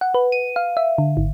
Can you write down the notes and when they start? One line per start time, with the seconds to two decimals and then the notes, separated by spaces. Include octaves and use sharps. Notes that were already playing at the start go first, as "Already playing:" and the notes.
0.01 F#5
0.14 B4
0.32 D#7
0.56 F5
0.77 E5
0.98 D3
1.17 G#1